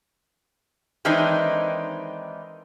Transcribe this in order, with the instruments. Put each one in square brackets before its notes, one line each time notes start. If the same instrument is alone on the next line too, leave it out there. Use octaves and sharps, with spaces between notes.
[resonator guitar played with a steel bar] D#3 E3 G#3 C4 D4 D#4